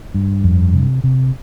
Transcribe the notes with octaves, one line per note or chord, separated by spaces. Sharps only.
G2
F2
C3
C3